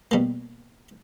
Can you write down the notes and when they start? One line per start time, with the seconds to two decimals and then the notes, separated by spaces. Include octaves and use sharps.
0.11 B2 G3 A#3